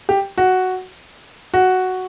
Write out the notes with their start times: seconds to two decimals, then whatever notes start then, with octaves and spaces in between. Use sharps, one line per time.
0.09 G4
0.38 F#4
1.54 F#4